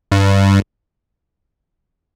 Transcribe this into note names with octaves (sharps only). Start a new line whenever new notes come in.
G2